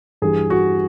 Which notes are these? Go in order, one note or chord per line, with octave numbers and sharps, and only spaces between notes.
G2 E3 G3 G#4
F#4